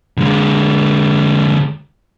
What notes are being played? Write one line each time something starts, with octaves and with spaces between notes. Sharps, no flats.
D3 G#3